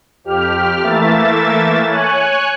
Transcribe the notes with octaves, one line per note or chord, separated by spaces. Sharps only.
F2 G4 F6
E3 A3 A#3 E5 A6
C#5 G#5 F#6